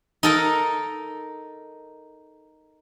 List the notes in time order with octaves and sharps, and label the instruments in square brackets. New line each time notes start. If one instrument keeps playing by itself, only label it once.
[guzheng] D#4 A4 A#4